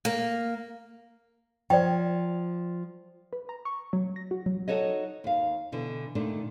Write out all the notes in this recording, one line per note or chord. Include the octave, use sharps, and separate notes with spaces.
A#3
F3 D5 G5
B4
A#5
C#6
F#3
A#6
F#4
F#3
D#4 F#4 A4 C#5 D#5
D#2 F5
B2 D3 E3
A#2 D3 D#3 A3 D4 D#4